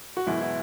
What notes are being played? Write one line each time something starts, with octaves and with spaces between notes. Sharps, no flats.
F#4
F#1 E2 B2 G#3 E4
E4